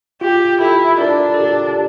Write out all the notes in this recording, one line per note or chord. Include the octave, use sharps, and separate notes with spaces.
F4 G4
E4 A4
D4 A#4
A4
G4